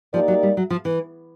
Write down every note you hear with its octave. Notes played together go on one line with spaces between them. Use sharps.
F3 A#3 D#4 G4 A#4 D5
F#3
G3
F#3
F3
E3